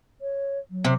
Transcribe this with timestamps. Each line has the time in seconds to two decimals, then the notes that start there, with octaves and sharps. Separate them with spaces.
0.21 C#5
0.71 F#3
0.85 C3